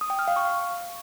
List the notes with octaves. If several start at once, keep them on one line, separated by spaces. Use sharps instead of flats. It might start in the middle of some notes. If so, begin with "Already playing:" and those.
D#6
G5
F6
F5
C#6